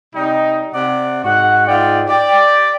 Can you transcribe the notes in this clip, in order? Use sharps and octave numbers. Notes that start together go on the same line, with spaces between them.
C3 G3 D#4
C3 D5 F#5
G#2 F#4 F#5
G#2 F4 D5 G5
G4 D5